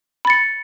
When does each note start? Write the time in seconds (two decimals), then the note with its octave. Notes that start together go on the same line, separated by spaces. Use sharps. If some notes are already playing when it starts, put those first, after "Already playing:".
0.25 B5
0.27 A6
0.30 C#7